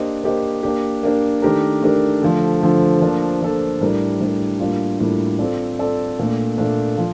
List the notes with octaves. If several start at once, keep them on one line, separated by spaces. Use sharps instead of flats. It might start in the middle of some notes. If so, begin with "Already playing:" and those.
Already playing: A#3 D4 G4 C5 D#5
A#3 D4 G4 C5 D#5
A#3 D4 G4
A#3 D4 G4
D#3 A3 D4 G4 A#4
D#3 A3 D4 G4 A#4
D3 F3 A3
D3 F3 A3
F3 A#3 D4 A4
F3 A#3 D4 A4
A2 G3 D4 G4 A#4
A2 G3 D4 G4 A#4
A2 G3 A#3 D4 F4
A2 G3 A#3 D4 F4
C4 F4 A4 D5
C4 F4 A4 D5
A#2 A3 D4
A#2 A3 D4
F3